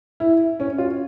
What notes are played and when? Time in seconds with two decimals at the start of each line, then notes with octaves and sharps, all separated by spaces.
0.20 E4
0.60 C#4
0.78 F4